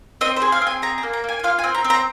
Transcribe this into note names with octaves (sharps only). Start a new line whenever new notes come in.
C4 D#5
C5
G#4
F5
C4 G#5
G#4 A#5
A#5
A#3
A#5
A#3 G#5
G#5
F4 F5
G#5
C4
A#5
C4
A#5